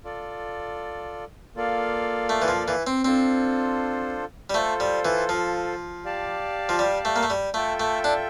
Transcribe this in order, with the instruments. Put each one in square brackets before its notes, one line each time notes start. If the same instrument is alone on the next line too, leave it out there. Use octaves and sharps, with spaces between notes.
[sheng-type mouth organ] F4 A4 D5
A#3 F4 A4 D5 F5
[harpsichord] A3
E3
F3
E3
C4
[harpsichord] C4 [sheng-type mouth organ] D4 F4 A4 C5
[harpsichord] G3
[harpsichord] A3 [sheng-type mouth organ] F4 A4 C5
[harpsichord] G3
E3
F3
[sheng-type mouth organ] G4 D5 F5 A5
[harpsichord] F3
G3
A3
A#3
A3
G3
[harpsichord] A3 [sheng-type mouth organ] F4 A4 E5 G5
[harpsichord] A3
D4